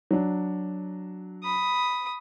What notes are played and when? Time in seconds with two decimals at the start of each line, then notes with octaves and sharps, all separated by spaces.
0.11 F#3 D4
1.44 B5 D#6